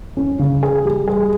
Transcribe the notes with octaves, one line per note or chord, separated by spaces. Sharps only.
C#4
C#3
G#4
G3
G#4